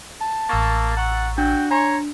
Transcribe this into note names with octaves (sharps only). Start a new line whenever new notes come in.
A5
A1 A#3 C#6 E6 A6
F#5 A#5 C#6
D4 F#4 G5
C#5 G#5 A#5 C6